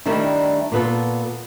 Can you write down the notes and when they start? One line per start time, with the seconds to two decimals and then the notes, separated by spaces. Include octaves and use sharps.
0.06 D#3 G3 A3 D4 E4 A#4
0.72 A#2 B3 A4